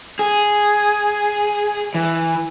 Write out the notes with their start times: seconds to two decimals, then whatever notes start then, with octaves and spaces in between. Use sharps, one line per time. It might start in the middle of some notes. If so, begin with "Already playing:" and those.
0.19 G#4
1.95 E3